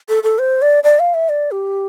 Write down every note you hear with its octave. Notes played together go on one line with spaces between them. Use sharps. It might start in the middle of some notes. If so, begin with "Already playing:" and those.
A4
A4
C5
D5
D5
F5
E5
D5
G4